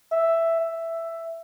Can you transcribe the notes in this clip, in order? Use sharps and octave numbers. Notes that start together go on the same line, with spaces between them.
E5
E5